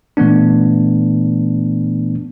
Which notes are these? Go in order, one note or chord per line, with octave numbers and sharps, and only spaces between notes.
A#2 E3 A3 B3 D4